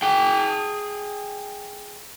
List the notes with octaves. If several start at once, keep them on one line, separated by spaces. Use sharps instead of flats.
G#4 G5